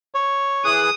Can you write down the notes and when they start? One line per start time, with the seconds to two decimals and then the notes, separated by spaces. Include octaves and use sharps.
0.15 C#5
0.65 E3 G#4 D#6 F#6